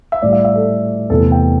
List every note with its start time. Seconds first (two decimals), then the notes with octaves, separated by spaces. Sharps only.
0.12 E5
0.22 A2 G3 D5
0.33 E5
0.45 E5
0.55 A4
1.10 E2 C3 E3 A3 A4
1.32 G5